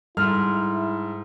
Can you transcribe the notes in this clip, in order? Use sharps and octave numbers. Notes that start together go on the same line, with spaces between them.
G#2 G3 E4 A4 F6